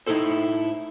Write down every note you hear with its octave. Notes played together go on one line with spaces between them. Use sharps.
A2 D#4 E4 G#4 A4 C5